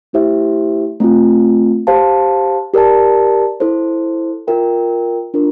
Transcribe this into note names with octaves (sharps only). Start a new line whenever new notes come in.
A3 E4 G4 C5 E5
A3 C4 F4
G4 C5 F5 A5
G4 A#4 D5 A5
E4 A4 C5
F4 A#4 E5 G5
D4 F4 A#4